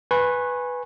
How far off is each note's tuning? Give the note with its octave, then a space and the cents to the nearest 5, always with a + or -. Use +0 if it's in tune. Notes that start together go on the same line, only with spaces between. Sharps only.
B4 +0 G#5 +0 C#6 -35